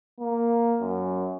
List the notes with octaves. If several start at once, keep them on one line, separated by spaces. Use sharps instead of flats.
A#3
F#2